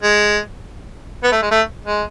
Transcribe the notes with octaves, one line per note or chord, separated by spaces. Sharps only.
G#3
B3
A3
G#3
A3
G#3